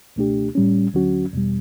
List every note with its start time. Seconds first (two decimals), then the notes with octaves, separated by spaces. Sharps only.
0.16 C#2 B2 A3 D4 G4
0.55 A2 G3 C#4
0.93 D2 D3 F#3 C#4 F#4
1.33 E2 B2 G3